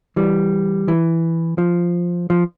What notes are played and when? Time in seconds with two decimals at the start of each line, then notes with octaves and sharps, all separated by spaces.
0.16 E3 G3
0.88 E3
1.58 F3
2.30 F3